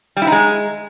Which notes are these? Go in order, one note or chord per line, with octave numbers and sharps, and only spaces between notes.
G3
E4
D#4
G#3